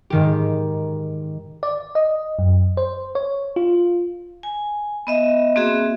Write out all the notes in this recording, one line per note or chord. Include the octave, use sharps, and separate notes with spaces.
G#2 D#3 G4
D5
D#5
F#2
C5
C#5
F4
G#5
B3 D#5 E5
A#3 C4 F#4 G#4 E5